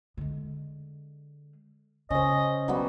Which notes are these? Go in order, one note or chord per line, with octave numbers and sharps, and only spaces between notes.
D3 G#3
C#3 C#4 C5 D#5
B2 F#3 G3 B3